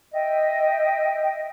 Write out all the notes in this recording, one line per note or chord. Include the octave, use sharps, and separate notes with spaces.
D#5 E5 G5